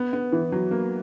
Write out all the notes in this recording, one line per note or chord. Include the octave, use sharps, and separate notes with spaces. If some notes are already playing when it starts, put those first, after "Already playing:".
Already playing: B3
B3
E3
F#3
A#3